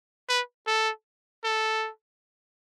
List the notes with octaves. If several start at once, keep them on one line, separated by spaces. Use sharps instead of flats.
B4
A4
A4